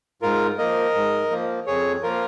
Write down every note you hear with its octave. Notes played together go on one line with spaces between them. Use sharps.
G#2 F4 A#4
F3 A#3 A#4 D#5
G#2
F3 A#3
F2 G#4 C#5
F3 A#3 F4 A#4